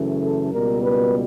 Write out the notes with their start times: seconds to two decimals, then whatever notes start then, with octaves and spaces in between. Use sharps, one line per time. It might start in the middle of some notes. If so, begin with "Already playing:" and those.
Already playing: F#2 C#3 E3 A3
0.22 A4
0.52 C#2 B2 G3 A#3 A#4
0.82 B4